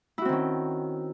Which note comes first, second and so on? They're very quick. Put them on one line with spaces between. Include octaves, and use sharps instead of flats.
E4 F#4 C4 D#3 C#4